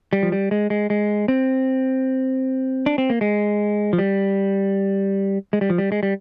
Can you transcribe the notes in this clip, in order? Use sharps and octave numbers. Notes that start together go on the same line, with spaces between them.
G3
F3
G3
G#3
G#3
G#3
C4
D4
C4
A#3
G#3
F3
G3
G#3
G3
F3
G3
G#3
G3